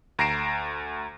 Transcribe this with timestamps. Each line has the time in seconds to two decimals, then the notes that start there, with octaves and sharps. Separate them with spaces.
0.19 D2 A#5 A#6 C7 D7 E7